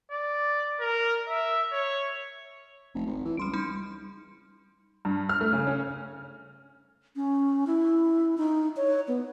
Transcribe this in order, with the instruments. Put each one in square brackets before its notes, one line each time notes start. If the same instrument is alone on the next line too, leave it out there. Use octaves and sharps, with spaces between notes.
[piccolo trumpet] D5
A#4
E5
C#5
[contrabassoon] F1
G#1
E3
[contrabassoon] C#2 [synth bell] G3 C6 D7
[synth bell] G3 D#4 C6
[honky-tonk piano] G2
F6
A3
C#3
C#4
[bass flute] C#4
E4
D#4
C#5
B3